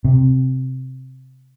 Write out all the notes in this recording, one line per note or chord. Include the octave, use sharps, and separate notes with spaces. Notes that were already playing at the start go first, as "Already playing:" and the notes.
C3